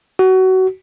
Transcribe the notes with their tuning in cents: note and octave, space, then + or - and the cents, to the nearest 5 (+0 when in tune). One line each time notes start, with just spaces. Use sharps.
F#4 +25